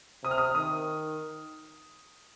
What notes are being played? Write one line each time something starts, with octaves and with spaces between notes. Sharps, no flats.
C3 D#6
F6
D#6
D#3 D#6